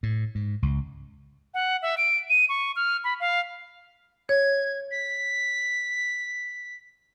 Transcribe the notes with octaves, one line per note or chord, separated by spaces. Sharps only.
A2
G#2
C#2
F#5
E5
D7
D#7
C#6
F6
B5
F5
C#5 G#6
B6